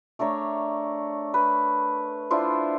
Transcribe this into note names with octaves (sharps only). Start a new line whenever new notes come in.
A3 D4 A#4 C#5
B4
D4 E4 F4 C5